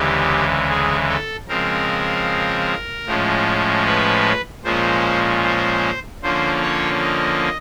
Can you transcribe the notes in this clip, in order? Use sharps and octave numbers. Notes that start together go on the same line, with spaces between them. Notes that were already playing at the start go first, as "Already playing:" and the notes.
Already playing: D2 C#3 E3 G#3 G4
G#4
A4
C#3 F3 G#3 C4 A#4
A2 F3 G#3 C#4
B4
A#2 F3 G#3 C#4 C5
C5
D3 F3 A#3 C#4 C5
C#5
D#5